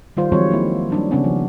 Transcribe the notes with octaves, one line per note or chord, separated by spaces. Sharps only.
D#3 G3 F4 C5
D#3 F3 F#3 G#3 C4 C#5
A#3 E4
G3 D4 D#4
C#3 G3 B3 C#4 D4
F3